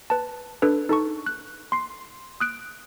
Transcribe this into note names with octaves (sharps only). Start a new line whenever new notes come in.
B4 A5
D4 A4 B4
D#4 A4 A5 C#6
F#6
C6 C7
D#6 F#6 D7